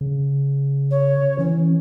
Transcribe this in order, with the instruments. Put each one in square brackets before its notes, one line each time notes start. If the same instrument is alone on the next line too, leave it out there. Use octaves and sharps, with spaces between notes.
[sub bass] C#3
[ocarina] C#5
[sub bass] E3 [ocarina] C#4